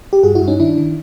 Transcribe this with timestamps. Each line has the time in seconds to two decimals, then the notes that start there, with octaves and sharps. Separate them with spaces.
0.13 G4
0.23 G2 F#4 G#4
0.35 E4 F#4
0.42 G2
0.48 C#4 D#4
0.60 D#3 D4 E4
0.78 D#3